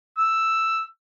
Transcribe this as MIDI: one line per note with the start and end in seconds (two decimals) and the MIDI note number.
0.17 0.82 88